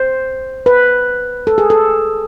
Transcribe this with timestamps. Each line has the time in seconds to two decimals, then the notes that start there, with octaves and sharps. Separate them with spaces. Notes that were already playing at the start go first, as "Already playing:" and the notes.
Already playing: C5
0.66 B4
1.47 A4
1.58 G#4
1.70 A4